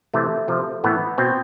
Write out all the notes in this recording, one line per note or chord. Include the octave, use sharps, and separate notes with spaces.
C3 E3 A3
C3 F3
A2 E3 B3
B2 C4